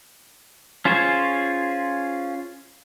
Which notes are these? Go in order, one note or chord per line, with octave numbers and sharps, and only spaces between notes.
C#4 F4 G#4 C5 C#5